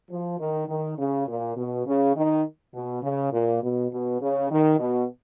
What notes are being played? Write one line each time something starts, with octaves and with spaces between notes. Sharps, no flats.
F3
D#3
D#3
C#3
A#2
B2
C#3
D#3
B2
C#3
A#2
B2
B2
C#3
D#3
B2